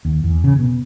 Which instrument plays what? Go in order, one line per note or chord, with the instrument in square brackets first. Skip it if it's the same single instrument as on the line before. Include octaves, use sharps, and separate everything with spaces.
[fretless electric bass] D#2
E2
C#3
B2